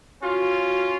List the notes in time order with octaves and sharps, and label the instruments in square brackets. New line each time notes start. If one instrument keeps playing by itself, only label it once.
[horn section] C#4 F4 [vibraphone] F#4